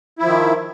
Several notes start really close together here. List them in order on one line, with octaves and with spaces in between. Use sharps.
E4 F3 D#3